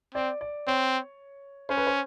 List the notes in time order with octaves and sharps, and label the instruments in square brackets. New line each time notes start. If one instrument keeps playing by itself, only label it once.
[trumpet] C4 [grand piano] D5
[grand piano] D5
[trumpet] C4 [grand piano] C#5
[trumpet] C#4 [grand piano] C5
[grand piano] B4
C5